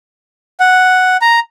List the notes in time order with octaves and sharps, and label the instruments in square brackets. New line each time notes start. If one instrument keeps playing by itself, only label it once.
[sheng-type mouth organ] F#5
A#5